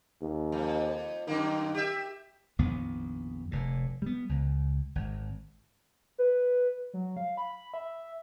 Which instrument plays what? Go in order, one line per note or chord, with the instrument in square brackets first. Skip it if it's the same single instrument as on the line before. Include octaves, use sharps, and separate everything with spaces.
[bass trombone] D#2
[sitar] F2
[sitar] F#2 A#3 [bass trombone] D#3
[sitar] G4 E5
[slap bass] A#1 F2 D#3 B3
F1 A2
G3 B3
C#2
G#1
[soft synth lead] B4
F#3
F5
B5
E5